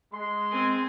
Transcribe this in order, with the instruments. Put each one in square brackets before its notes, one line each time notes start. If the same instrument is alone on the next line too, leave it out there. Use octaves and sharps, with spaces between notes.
[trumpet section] G#3 C6
[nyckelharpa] C4 G#5